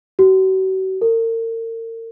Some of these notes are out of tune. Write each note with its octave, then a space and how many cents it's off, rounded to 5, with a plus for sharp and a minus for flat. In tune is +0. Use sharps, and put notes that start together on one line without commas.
F#4 +40
A#4 -40